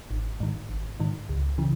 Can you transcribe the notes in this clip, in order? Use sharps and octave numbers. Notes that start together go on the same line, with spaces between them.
G#1
G#2 D#3
G#1
G#2 D#3
C#2
C#3 E3